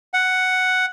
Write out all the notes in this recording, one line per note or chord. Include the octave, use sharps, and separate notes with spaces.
F#5